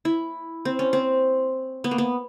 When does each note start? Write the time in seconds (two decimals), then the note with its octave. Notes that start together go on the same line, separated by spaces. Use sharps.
0.05 E4
0.65 C4
0.79 C#4
0.93 C4
1.84 B3
1.91 A#3
1.98 B3